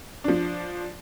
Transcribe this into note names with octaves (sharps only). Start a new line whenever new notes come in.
F3 D4